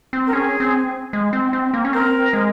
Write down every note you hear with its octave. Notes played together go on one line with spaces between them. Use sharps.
C4
A#4
C#4 G#4
C4
G#3
C4
C4
A#3
C#4
C4 A#4
G#3